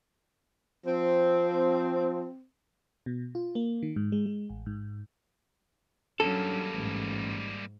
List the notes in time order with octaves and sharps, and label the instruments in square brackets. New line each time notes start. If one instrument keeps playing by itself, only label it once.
[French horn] F3 [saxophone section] C4
[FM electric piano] B2
F4
A#3
D#3
G#2
G#3
G#3
A1
G#2
[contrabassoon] G2 [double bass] F#3 C#4 [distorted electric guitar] G3 A#3 [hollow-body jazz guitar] A4
[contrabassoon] A1 [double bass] G#2